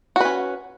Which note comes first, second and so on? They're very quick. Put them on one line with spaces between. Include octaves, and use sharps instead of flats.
F#4 B4 C#4